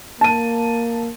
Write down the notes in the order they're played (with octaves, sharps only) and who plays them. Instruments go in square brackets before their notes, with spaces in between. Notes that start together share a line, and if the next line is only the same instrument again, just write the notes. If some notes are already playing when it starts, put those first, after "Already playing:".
[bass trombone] A#3 [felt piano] A5 D#7